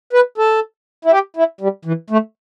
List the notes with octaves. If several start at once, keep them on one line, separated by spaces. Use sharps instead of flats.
B4
A4
E4
G4
E4
G3
E3
A3